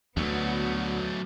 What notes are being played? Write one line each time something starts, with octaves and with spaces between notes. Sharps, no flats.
D2 F#3 A3 B3